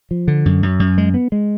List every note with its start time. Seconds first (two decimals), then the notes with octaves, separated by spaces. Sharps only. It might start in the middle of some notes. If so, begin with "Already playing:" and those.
0.11 F3
0.28 D3
0.46 F#2
0.63 F#2
0.80 F#2
0.98 G#3
1.14 B3
1.32 G#3